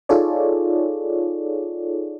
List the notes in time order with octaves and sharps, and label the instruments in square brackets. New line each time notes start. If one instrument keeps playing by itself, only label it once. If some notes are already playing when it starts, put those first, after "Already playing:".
[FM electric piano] D#4 F4 G#4 A4 C#5 D5